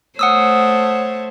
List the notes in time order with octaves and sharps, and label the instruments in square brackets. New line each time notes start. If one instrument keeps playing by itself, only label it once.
[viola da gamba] A3 C5 C#5 [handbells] F#5 D#6 E6